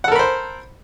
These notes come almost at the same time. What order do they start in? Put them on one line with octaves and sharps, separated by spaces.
F#5 A4 A#4 B5 C5